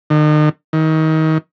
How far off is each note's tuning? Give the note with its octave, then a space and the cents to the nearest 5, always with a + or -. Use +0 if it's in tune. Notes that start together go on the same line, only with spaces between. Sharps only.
D#3 -45
D#3 +25